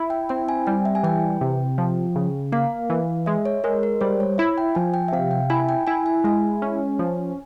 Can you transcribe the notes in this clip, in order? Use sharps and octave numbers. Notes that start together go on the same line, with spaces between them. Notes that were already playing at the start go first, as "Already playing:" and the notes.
Already playing: E4
G5
C4 G5
G#5
G3 G5
E5
G#5
E3 G5
C3
F3
C#3
A#3 F5
E3
G#3 E5
C#5
G#3 A#4
A#4
G3 C5
C#5
E4 E5
G5
F3 G#5
G5
E5
C3 F5
G5
E4 G#5
G5
E4 G#5
G#5
G#3 G#5
C#4
F3